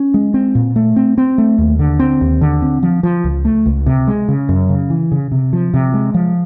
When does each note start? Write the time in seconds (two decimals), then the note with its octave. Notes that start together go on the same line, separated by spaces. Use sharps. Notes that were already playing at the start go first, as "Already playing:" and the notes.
Already playing: C#4
0.14 G#3
0.34 C4
0.55 A#2
0.76 A3
0.96 C4
1.18 C4
1.38 A3
1.58 D#2
1.79 D3
1.99 C4
2.21 D#2
2.41 D3
2.62 C4
2.83 F3
3.03 F3
3.24 C#2
3.45 A3
3.66 C#2
3.86 C3
4.07 G#3
4.28 C#3
4.49 F#2
4.69 C#3
4.90 E3
5.11 C#3
5.32 C3
5.53 F3
5.74 C3
5.94 G#3
6.14 F3